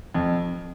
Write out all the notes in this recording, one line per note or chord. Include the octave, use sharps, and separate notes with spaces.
F2